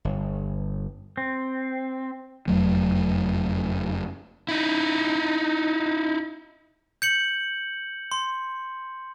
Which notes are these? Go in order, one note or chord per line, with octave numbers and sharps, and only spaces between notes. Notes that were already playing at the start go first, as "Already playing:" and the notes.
G1
C4
F#1 F2 F#3 A3
D#4 E4
G6 C#7 F#7
C6